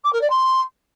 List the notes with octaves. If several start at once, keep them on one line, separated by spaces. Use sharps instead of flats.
D6
A#4
D5
C6